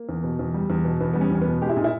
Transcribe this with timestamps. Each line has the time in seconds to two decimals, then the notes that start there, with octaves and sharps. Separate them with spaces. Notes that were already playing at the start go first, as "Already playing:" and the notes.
Already playing: A#3
0.09 E2
0.24 B2
0.39 E2
0.54 G3
0.70 E2
0.85 B2
1.01 E2 B3
1.13 G3 B3
1.21 C#4
1.31 E2 C#4
1.41 B3
1.46 B2
1.62 G#3 G4
1.69 E4
1.77 A#2 D#4
1.84 E4